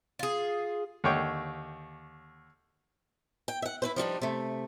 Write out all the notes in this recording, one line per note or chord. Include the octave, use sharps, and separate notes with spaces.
F4 G#4
D#2 D3 C#5 G5 C#6 D6
G5
E5 F#5
E4 B4 C5
F3 G3 D4 D#4
C3 A3